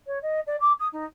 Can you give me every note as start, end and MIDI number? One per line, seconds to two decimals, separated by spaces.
0.06 0.18 73
0.22 0.40 75
0.46 0.56 74
0.60 0.72 86
0.79 0.87 87
0.92 1.04 63